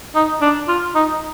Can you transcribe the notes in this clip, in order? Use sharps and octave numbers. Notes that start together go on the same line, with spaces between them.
D#4
D4
F4
D#4